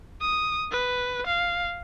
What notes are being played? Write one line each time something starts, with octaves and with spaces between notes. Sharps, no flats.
D#6
B4
F5